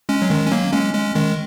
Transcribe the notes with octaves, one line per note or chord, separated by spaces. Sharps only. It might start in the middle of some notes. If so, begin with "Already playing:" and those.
G#3 C#4
F#3
D#3 G#3
C#4
F#3 A#3
G#3 C#4
G#3 C#4
D#3 G#3